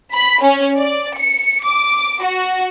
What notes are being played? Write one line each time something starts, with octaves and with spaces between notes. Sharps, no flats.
B5
C#4
D5
C#7
D6
F#4